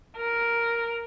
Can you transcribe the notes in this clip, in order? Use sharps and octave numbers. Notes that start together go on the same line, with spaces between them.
A#4